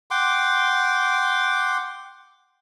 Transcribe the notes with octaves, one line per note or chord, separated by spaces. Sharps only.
F#5 G5 C6 D6